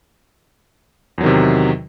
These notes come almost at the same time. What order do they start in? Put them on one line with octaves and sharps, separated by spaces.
E2 F#3 D#3 C3